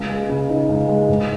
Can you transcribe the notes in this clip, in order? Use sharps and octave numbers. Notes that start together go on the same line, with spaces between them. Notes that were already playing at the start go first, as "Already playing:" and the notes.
Already playing: C#2
G#3
C#3
D#4
C#2
G#3
G#2